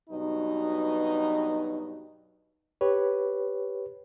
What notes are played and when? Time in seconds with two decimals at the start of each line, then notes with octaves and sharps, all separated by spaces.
0.10 G2 B2 F#3 D#4
2.81 G4 B4 C#5